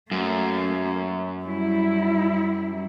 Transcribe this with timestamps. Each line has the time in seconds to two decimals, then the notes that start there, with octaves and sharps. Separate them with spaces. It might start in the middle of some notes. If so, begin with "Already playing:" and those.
0.11 F#2 A3 A#3
1.45 F#3 G3 E4